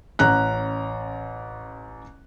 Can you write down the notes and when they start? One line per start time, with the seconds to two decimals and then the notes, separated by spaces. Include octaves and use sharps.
0.19 A1 C#4 A#5 F#6